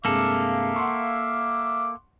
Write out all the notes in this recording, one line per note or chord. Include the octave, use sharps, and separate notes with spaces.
G2 C3 G#3 A#3 A4 E5 F5 D6
F#5 C6 C#6